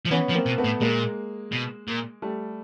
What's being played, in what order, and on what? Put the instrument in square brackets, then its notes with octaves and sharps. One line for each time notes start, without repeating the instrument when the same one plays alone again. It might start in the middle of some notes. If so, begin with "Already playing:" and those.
[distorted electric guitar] F3
[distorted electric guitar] E3 [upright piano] B3 C#4
[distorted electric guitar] F3
[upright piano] A#3 C4
[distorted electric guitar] B2
[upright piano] A3 B3
[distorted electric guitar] A2
[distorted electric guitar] A#2 [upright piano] G#3 A#3
[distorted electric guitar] B2
A#2
[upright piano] G3 A3